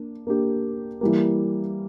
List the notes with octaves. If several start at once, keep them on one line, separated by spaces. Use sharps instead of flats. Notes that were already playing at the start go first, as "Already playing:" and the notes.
Already playing: A#3 D4
A#3 D4 G4
E3 G3 A#3